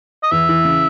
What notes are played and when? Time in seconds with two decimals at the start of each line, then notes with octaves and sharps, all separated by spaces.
0.23 D#5
0.31 E2 E5
0.49 E3
0.65 C#3